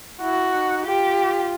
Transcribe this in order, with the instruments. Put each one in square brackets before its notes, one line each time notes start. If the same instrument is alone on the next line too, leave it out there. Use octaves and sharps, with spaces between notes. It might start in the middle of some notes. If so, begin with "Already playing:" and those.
[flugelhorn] E4 [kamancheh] F#4
[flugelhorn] D#4
[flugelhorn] F4 [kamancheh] G4